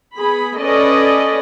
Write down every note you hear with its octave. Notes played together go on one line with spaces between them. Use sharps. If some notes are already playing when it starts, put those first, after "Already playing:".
B3 G#4 B5
C#4 A4 B4 D5 D#5